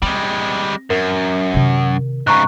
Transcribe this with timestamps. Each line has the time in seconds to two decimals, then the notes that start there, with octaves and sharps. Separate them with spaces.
0.02 G3 G#3 C4
0.90 F#2 A#4
1.54 C3 D#3
2.27 G#2 C#3 A#5 C#6 F#6